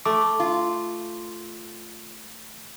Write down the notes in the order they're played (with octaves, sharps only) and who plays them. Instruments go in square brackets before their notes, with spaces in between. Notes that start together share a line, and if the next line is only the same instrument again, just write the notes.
[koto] A3 [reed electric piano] D6
[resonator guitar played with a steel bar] F4